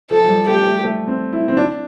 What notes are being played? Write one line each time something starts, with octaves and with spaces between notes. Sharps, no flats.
F3 A4
F3
G3
A3 G4
A3
A3
C4
E4
C4
D4